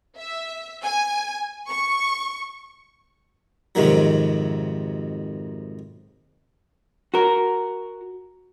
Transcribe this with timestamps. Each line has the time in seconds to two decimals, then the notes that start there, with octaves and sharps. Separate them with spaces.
0.18 E5
0.83 G#5
1.68 C#6
3.75 F2 G#2 C3 D#3 F#3
7.14 F#4 A#4